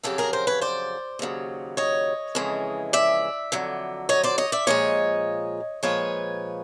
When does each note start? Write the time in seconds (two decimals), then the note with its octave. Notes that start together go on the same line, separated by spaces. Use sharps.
0.03 F2 C#3 F#3 G4 A4
0.18 G#4 A#4
0.33 A#4 C5
0.47 B4 C#5
0.61 C5 D5
1.19 D#2 C#3 F#3
1.77 C#5 D#5
2.35 F2 C#3 E3 G#3
2.93 D5 E5
3.52 F2 D3 F#3
4.09 C#5 D#5
4.23 C5 D5
4.38 C#5 D#5
4.52 D5 E5
4.67 A#2 F3 G#3 C#5 D#5
5.83 A#2 F3 G#3 B4 C#5